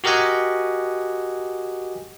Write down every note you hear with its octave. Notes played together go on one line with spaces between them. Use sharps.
F#4 G4 A#4 D#5 F#5 G#5